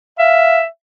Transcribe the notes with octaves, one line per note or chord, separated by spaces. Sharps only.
E5 F5